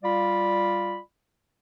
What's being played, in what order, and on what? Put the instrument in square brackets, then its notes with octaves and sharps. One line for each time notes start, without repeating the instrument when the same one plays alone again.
[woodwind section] G3 F4 D5 F5 B5